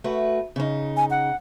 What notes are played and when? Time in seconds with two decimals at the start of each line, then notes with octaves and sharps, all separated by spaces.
0.04 A3 F#4 B4
0.56 C#3 D#4
0.97 G#5
1.10 F#5